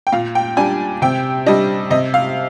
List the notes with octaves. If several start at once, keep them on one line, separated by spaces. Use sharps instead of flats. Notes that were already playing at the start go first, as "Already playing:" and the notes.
G5
A#2 F5
G5
G3 D4 G#5
C3 G5
G3 D4 D#5
C3 D#5
F5